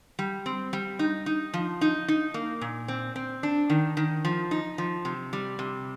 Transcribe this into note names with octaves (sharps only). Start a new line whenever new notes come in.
G3
C4
G3
D#4
D#4
F3
D#4
D#4
A#3
A#2
C4
C4
D4
D#3
D#3
F3
D#4
F3
C3
G3
C3